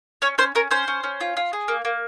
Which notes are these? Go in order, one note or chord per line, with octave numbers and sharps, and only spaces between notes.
C#4 C#5
C#4 C5
C#4 A#4
C#4 C5
C#4
C#4
F4
F4
G#4
A#3
A#3